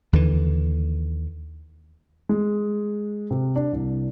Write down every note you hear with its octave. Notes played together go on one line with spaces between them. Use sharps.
D#2 D3 E3
G#3
C3
D4
C2